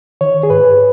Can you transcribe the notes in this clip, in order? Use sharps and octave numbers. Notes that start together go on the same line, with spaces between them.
D#3 C#5
G#4
G#2 B4